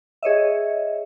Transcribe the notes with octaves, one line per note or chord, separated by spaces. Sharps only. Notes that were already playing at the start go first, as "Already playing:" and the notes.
G#4 C#5 D#5 E5